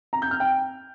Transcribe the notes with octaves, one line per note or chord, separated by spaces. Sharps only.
A#5
G6
F6
G5